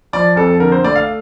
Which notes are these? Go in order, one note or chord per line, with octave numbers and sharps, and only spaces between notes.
F3 D5
F2 A4
D3 A#4
C5
A3 D5
F5